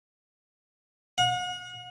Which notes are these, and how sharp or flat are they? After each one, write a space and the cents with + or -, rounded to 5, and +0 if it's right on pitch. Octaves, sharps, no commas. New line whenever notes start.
F#5 -40